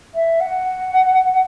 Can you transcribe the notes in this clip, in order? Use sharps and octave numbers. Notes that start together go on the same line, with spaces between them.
E5
F#5